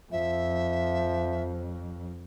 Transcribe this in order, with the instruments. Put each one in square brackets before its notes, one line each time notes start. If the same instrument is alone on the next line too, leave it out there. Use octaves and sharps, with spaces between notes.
[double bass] F2 [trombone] F3 [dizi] E5